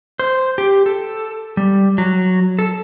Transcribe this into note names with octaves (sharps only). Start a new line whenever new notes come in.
C5
G4
A4
G3
F#3
A4